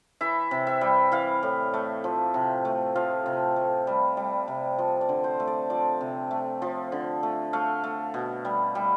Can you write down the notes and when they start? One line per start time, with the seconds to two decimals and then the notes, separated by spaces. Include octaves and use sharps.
0.21 E3 E5
0.51 C3
0.67 E5
0.81 G3
1.12 E3 F5
1.43 A2
1.74 A3
2.04 F3
2.34 C3
2.65 A3
2.95 F3 F5
3.26 C3
3.56 A3
3.87 G3
4.17 G3
4.48 C3
4.78 F3
5.01 D5
5.09 D3
5.24 C5
5.40 A3
5.47 D5
5.70 F3 D5
6.00 C3
6.31 A3
6.62 F3
6.92 D3
7.23 A3
7.53 A3 F5
7.84 A3
8.14 B2
8.45 G3
8.75 G3